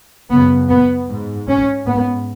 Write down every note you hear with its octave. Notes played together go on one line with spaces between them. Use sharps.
F#2 C#3 B3
B3
G#2
C#4
G#2 B3